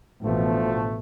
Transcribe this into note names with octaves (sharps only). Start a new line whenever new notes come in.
A1 D2 B2 F3 A3